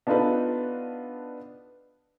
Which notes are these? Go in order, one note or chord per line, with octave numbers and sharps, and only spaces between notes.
B3 D4 D#4 F4 A4 B4